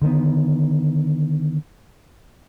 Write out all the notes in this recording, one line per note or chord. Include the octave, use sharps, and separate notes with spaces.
D3 D#3 A3 B3